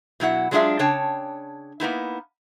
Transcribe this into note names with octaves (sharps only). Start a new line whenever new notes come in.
B2 F#3 E4 F#5
F#3 G#3 D4 F4 G#4 E5
C#3 D4 C#5 G5 A5
A#3 B3 D#4 E4